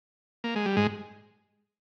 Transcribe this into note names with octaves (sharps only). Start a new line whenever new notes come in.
A#3
G#3
G3
G#2 G#3